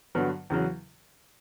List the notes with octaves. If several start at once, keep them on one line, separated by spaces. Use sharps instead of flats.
G2 D3 F#3 B3
E2 C#3 F#3